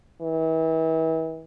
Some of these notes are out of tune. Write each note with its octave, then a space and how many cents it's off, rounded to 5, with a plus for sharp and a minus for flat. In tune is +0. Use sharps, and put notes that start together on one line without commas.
E3 -35